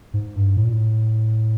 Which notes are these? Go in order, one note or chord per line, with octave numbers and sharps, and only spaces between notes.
G#2
G2
A2
A#2
A2